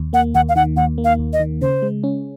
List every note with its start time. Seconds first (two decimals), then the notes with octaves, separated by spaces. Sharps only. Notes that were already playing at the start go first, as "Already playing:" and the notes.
Already playing: D#2
0.13 A#3 F#5
0.34 D#2 F#5
0.49 F5
0.56 D#3 F#5
0.77 D#2 F#5
0.98 A#3
1.04 F5
1.19 D#2
1.33 D#5
1.40 D#3
1.61 C#3 C5
1.82 G#3
2.03 C#4